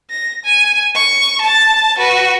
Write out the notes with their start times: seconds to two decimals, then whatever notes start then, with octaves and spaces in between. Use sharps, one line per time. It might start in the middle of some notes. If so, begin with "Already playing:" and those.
0.11 A#6
0.45 G#5
0.95 C#6
1.41 A5 A6
1.99 F#4 B4